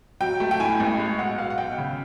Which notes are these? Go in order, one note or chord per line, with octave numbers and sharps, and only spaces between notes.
F#3 G5
A3
G5
A2 G#5
A1
G#3
B1 F#5
B2 F5
F#5
B1 G5
C#3